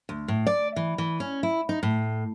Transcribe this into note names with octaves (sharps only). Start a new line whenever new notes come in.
D2
A2
D5
E3
E3
C#4
E4
D#4
A2